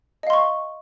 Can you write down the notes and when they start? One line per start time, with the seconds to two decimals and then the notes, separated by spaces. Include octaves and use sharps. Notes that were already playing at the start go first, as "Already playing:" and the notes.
0.23 D#5
0.27 F5
0.30 C6
0.33 C#6